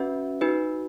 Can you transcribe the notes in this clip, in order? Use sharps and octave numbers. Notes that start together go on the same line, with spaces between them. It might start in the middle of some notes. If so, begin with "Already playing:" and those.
Already playing: C#4 F#4 B4 E5
D#4 F#4 B4